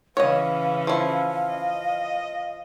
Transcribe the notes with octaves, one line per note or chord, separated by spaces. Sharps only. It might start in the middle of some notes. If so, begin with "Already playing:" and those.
C#3 E3 C#4 C#5 D#5 F5
F3 E4
D#5